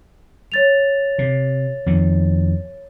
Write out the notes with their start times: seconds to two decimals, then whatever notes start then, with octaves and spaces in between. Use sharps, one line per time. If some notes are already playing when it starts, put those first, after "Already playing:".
0.52 C#5 A6 F7
1.18 C3
1.86 F2 D#3